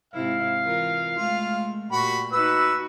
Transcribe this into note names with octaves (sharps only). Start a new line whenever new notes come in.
G#2 C3 E4 F5
E3 F4 A#4
G#3 A3 F4
A#2 F#4 G4 B5
D#4 F#4 B4 E6